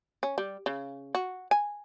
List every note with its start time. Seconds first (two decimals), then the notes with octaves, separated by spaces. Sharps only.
0.23 C#4
0.38 G3
0.66 C#3
1.15 F#4
1.51 G#5